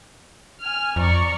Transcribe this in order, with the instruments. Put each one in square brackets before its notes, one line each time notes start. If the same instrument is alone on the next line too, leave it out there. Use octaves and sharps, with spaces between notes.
[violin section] G#5 F6
[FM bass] F2 [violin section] D5 A#5 C#6